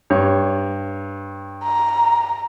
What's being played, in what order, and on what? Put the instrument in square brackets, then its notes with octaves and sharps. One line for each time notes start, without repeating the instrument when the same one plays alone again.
[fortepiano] G2 C#5
[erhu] A#5